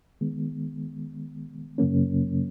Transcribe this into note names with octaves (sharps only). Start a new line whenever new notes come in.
D#3 G#3 B3
F#2 C#3 F#3 A#3 C#4